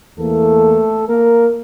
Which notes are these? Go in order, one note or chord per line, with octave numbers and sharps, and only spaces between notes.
E2 E3 A3 A#3 A4
A#3 A#4